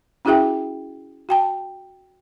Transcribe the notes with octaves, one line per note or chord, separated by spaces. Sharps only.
C#4 E4 F#4 G#4 E5 G5
F#4 G5 A5